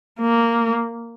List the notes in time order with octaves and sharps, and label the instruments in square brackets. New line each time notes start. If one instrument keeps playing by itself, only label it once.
[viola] A#3